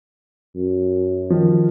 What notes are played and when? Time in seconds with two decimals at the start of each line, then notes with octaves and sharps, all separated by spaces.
0.56 F#2
1.30 D#3 F3